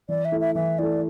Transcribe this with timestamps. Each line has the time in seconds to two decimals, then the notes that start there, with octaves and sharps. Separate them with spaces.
0.09 E3 D5
0.25 E5
0.32 A3 E4
0.41 E5
0.55 E3 E5
0.79 A3 E4 D5